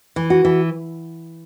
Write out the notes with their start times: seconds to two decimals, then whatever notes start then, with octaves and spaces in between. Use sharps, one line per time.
0.16 E3
0.30 F#4
0.45 E3